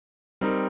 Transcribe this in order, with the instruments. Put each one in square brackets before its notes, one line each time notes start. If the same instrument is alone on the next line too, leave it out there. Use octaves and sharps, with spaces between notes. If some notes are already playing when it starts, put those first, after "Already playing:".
[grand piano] G3 C4 D#4 A#4